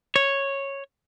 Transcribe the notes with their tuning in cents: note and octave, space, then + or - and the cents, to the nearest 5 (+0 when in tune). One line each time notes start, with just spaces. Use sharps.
C#5 -5